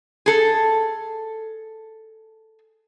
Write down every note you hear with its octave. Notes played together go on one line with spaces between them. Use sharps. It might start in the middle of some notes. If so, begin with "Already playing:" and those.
G#4 A4